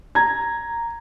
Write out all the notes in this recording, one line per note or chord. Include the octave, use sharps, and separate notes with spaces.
A#5 G#6